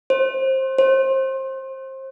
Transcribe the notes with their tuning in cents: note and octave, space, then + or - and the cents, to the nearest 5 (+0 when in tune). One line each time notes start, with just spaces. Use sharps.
C5 +20
C5 +25